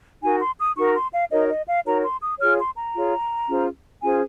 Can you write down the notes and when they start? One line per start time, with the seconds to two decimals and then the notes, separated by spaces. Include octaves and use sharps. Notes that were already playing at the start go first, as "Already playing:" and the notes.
0.22 D#4 F#4 A#4 G#5
0.40 C6
0.59 D#6
0.77 D#4 F#4 A#4 C#6
0.95 C6
1.13 F5
1.31 D#4 F#4 A#4 C#5 D#5
1.49 D#5
1.67 F5
1.85 D#4 F#4 A#4 C#5 A#5
2.03 C6
2.21 D#6
2.39 F4 G#4 C#5 F6
2.58 C6
2.76 A#5
2.94 F4 G#4 C#5
3.48 C#4 F4 G#4 C5
4.02 C#4 F4 G#4 C5 G#5